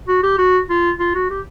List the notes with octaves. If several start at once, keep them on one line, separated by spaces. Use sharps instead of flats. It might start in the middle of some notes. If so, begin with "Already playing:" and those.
F#4
G4
F#4
F4
F4
F#4
G4